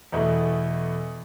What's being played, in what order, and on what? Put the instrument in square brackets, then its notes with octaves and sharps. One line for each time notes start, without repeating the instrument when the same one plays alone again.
[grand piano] E2 B2 A3 E4